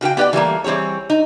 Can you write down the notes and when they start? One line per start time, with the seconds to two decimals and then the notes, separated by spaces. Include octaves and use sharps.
0.01 C#3 F#4 A4 G5
0.17 B3 G4 B4 D5 G5
0.33 E3 G3 A3 A#3
0.64 E3 G3 C4 G#4 C#5
1.10 D#4